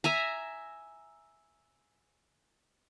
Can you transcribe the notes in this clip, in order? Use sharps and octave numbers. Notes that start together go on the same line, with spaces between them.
E5 G#5 A#5